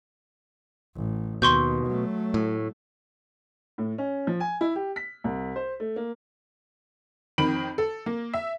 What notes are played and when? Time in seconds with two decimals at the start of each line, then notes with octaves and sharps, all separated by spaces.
0.96 A1
1.42 D#2 B2 C6 C#6 G6
1.87 F#3 A3
2.34 A2
3.78 A2
3.98 C#4
4.27 F3
4.40 G#5
4.61 E4
4.76 G4
4.96 B6
5.24 C2
5.56 C5
5.80 A3
5.96 A#3
7.38 F2 D#3 B5 D7 F#7
7.78 A4
8.06 A#3
8.34 E5